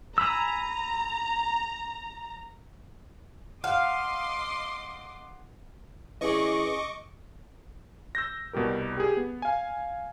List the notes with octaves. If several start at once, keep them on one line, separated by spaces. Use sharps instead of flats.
G#5 A#5 B5 E6
D#5 F5 F#5 C6 D6
E3 C#4 G#4 D#5 C#6 D6
E6 G6 A#6
C2 B2 G3 G4 A#4
G4 G#4
B3
F5 G#5